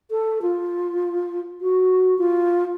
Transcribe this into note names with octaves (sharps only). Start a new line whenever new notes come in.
A4
F4
F#4
F4